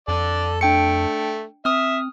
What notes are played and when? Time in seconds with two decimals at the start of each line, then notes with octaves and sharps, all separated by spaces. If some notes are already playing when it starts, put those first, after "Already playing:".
0.08 F2 A4 D5
0.61 A3 D4 G5 C#7
1.65 C4 E5 D#6 F6